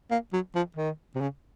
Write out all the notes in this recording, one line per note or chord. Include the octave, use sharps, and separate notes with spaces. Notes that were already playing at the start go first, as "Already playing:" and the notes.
A#3
F#3
F3
D#3
C3
C#3